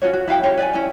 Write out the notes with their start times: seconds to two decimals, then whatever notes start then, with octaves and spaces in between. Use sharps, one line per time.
0.02 C#4 F4 F#4 C#5
0.13 F#4
0.28 E4 F#4 F5 G5
0.43 C#4 G4 C#5
0.57 B4 D5 D#5 G#5
0.73 C#4 E4 G#5